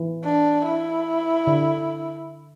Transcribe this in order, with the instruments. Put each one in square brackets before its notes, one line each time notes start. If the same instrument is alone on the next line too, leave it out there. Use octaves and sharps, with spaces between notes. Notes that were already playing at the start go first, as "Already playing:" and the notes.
Already playing: [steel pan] E3
[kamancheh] D4
E4
[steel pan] D3